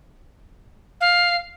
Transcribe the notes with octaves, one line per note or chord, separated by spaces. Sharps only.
F5